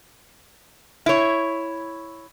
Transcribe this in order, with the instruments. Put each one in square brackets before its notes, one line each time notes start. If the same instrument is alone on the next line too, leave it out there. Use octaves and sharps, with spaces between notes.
[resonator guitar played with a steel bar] E4 C#5